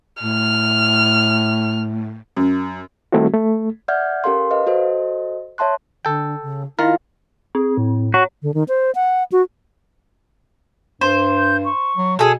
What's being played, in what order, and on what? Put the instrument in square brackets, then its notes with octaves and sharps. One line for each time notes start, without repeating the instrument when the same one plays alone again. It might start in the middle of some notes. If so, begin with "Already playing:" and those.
[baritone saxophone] A2 [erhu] F6
[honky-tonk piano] F#2
[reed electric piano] D#3 G3 A3 C4 E4 F#4
A3
[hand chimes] D5 E5 F#5 F6 G6 G#6
C#4 G4 A4 A#4 F5 C6
B4 D#5 F5
F#4 A4 C5 D#5
C#5 E5 A5 C6 F#6
[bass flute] D3 [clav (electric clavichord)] A4 G5
[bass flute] C#3
[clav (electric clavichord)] D#3 A#4 [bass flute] E4 [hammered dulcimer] F4
[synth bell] C4 [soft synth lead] G#4
[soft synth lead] A2
[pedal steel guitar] F#4 [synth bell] C#5
[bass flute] D3
D#3
C5
F#5
F#4
[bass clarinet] G2 [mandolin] C5
[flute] G6
C#6
[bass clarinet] F#3
[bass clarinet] B2 [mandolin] G#4 A4 [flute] G#5